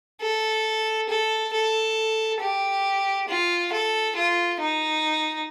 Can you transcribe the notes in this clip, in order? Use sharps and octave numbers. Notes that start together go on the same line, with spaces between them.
A4
A4
A4
G4
F4
A4
F4
D#4